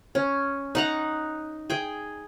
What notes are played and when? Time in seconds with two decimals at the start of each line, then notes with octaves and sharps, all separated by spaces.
0.15 C#4
0.75 D#4 F#5 A#5
1.70 G#4 G5